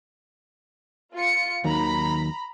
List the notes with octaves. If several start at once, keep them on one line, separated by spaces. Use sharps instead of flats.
F4 C#7
D#2 D#3 F#3 A#5 B5